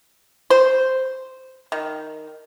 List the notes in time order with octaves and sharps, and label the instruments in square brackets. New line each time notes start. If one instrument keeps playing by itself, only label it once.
[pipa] C5
D#3